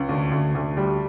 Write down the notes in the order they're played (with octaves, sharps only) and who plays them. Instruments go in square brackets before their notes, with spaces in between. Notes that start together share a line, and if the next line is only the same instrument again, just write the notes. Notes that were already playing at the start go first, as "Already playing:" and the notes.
Already playing: [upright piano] C#2
D2
D2
D2
G3